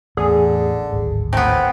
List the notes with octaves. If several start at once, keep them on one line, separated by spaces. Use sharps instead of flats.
A1 E2 D3 G#4
D1 G#1
A2 B3 C4